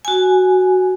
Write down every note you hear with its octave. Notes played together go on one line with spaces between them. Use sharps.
F#4 G#5